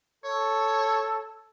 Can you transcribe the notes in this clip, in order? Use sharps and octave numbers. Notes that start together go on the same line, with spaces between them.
A4 C#5